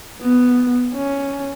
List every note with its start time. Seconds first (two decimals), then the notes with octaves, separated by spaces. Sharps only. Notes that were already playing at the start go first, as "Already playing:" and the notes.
0.22 B3
0.93 C#4